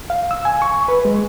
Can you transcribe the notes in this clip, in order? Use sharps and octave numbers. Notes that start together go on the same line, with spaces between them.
F5
E6
G#5
C#6
B4
G#3